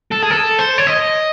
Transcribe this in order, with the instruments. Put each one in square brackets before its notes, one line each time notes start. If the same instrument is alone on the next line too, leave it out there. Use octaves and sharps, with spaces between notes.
[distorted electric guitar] A4
G#4
A4
C5
C#5
D#5